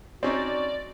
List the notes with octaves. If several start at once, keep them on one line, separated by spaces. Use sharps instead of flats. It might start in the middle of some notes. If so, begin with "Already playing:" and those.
C4 C#4 D#4 F#4 D5